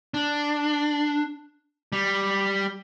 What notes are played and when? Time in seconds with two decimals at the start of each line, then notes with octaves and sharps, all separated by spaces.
0.14 D4
1.92 G3